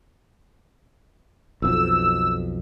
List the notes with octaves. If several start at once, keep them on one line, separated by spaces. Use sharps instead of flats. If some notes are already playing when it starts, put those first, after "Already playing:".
B1 F2 E6